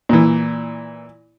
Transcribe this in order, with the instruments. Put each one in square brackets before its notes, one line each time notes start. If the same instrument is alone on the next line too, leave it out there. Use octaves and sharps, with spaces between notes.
[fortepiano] A#2 E3